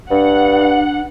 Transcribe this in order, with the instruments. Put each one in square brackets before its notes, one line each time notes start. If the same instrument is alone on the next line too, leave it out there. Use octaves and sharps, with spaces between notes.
[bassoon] G2 [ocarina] D4 [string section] F#5